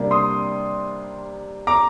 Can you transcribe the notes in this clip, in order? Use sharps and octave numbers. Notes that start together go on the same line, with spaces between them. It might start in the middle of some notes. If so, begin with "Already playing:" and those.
Already playing: C3 G3 A#3 D4
C6 D#6
A#5 D6